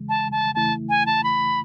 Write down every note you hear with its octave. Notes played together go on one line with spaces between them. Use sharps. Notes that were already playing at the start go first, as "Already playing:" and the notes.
Already playing: E2 C#3 E3 G#3
A5
A5
E2 C#3 E3 A3 E4 A5
G#5
A5
B5